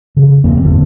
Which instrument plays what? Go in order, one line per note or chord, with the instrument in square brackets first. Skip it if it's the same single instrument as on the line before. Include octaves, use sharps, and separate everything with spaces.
[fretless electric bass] C#3
E2 F#3 A#3 C4
D1 G1 D3